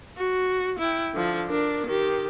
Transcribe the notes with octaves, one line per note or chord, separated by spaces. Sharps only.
F#4
E4 G5
D3 F3
D4 A#4
D#3 G4